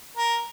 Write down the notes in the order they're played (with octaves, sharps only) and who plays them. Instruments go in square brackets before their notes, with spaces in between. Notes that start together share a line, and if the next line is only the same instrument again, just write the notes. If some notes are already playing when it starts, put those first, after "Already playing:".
[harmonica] A#4